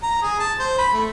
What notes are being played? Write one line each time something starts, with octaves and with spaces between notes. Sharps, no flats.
A#5
G#4
A5
C5
B5
A3